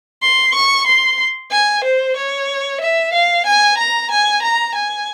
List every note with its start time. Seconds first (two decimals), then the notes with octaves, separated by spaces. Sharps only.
0.22 C6
0.55 C#6
0.87 C6
1.51 G#5
1.84 C5
2.17 C#5
2.81 E5
3.13 F5
3.46 G#5
3.78 A#5
4.11 G#5
4.42 A#5
4.75 G#5